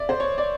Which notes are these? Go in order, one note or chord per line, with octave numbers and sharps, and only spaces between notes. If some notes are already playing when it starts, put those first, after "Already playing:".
Already playing: D5 E5
C5
C#5
D5